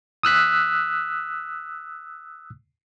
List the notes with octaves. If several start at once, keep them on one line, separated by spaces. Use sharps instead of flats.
D#6 E6 F#6 B6